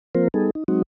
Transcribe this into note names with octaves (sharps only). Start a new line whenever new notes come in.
F3 A#3 C4 F4 A#4 C5
G3 B3 D#4 G#4 A4
D#4
F#3 G#3 C4 D#4 F#4